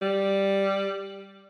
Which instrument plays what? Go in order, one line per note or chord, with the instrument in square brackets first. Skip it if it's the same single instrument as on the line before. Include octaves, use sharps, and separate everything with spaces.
[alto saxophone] G3